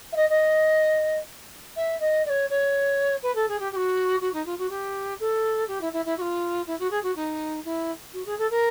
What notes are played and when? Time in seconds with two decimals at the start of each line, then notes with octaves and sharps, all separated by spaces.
0.12 E5
0.17 D#5
0.30 D#5
1.76 E5
2.00 D#5
2.26 D5
2.30 C#5
2.50 C#5
3.23 B4
3.35 A4
3.49 G#4
3.60 G4
3.72 G4
3.76 F#4
4.21 F#4
4.34 D#4
4.46 F4
4.59 F#4
4.70 G4
5.20 A4
5.68 G4
5.81 E4
5.93 E4
6.06 E4
6.18 F#4
6.21 F4
6.67 E4
6.80 F#4
6.91 G#4
7.03 F#4
7.16 D#4
7.65 E4
8.13 F#4
8.26 G#4
8.38 A4
8.50 A#4